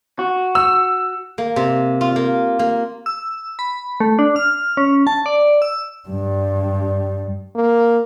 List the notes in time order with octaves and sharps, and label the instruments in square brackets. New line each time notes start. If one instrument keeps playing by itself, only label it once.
[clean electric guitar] F#4
[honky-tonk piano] E6
[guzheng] A#3
C3
F4
A#3
A#3
[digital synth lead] E6
B5
A3
D4
F6
C#4
A5
D5
E6
[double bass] G2 G3
[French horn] A#3